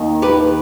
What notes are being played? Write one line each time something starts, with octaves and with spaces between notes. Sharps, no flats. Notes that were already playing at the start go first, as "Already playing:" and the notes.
Already playing: D#2 D#3
G4 B4